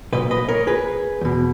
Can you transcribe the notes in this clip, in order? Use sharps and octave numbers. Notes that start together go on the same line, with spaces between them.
B1 A#2 B4 D#5
B4 D#5
A#4 C#5
G#4 B4
E2 B2